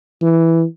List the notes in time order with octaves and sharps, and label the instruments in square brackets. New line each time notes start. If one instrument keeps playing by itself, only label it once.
[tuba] E3